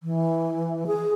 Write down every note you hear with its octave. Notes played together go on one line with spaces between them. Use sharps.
E3
G#4